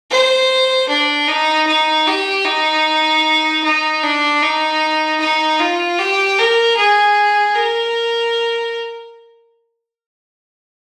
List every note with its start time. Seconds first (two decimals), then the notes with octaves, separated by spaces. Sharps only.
0.10 C5
0.89 D4
1.28 D#4
1.67 D#4
2.07 G4
2.45 D#4
3.64 D#4
4.03 D4
4.42 D#4
5.20 D#4
5.60 F4
5.99 G4
6.39 A#4
6.77 G#4
7.55 A#4